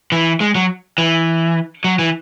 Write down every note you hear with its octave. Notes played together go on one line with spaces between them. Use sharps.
E3
G#3
F#3
E3
F#3
E3